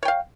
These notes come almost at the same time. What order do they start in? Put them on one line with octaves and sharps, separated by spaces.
C#5 G5 F5